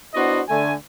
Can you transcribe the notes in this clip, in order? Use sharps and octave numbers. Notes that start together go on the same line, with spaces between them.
B3 D4 E4 F#4 C5 D#5
D3 A3 G#5